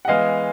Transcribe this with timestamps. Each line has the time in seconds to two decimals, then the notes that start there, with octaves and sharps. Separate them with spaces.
0.05 F#5
0.08 E3 G#3 B3 D#5 F5